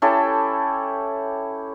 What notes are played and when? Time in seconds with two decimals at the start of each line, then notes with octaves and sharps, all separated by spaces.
0.02 C#4 E4 G4 A4